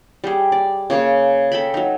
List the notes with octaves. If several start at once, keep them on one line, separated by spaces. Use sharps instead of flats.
G3 G4 G#4
D5
C#3 A#3 G#4 C#5
A4 G5 B5
F#3 D#4